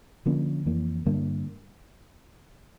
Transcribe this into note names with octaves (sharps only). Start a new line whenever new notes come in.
D3 F3 A#3 C#4
F2 E3 A#3
G2 D3 G3 A#3